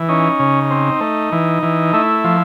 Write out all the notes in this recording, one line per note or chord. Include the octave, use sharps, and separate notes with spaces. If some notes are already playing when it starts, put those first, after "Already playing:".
Already playing: E3
C#4 D#4
C#3
C4
A3
E3
E3
A3 E4
F3